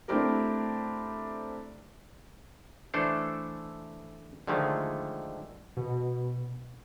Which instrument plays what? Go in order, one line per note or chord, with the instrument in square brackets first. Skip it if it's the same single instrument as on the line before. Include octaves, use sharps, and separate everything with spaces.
[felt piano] A3 C4 D4 E4 G4 A#4
[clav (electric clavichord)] E3 A3 D4 A4 C5
D3 D#3 F3 G#3 A3
[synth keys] B2